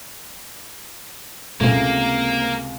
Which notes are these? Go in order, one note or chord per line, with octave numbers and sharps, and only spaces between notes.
C#2 C3 A3 A#3 C4 E5